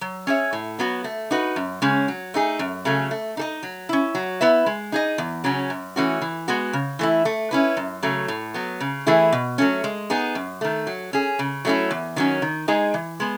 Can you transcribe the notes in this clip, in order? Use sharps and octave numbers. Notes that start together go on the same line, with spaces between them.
F#3
C#4 G#4 C#5 E5
A2
F#3 B3 F#4
A3
D#4 F#4 B4
F#2
C#3 G#3 C#4
F#3
A3 D#4 G#4
F#2
C#3 F#3 A3 C#4
A3
D#4 A4 D#5
F#3
C#4 E4
F#3
B3 E4 B4 E5
G#3
D#4 G#4 D#5
E2
C#3 F#3 C#4
F#2
E3 A3 C#4 F#4
E3
G#3 B3 F#4
C#3
E3 A3 E4
A3
C#4 E4 B4
F#2
C#3 F#3 A3
A2
F#3 B3
C#3
E3 A3 E4 G#4
B2
F#3 A3 C#4
G#3
B3 D#4 G#4
F#2
D#3 A3
F#3
C#4 G#4
C#3
F#3 A3 C#4 E4
E2
D#3 F#3 C#4
D#3
G#3 D#4 G#4 D#5
E3
G#3 B3